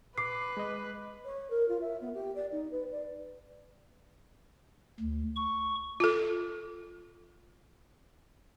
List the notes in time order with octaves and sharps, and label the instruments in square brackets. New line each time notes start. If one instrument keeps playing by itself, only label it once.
[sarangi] B4 [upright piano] D6 [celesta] C7
[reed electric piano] G#3 D#5
[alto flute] C#5
A#4
F4
E5
B3
G4
D5
D#4
B4
D5
[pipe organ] D2
C#6
[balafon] F4 A4